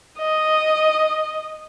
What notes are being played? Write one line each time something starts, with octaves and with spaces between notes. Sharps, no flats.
D#5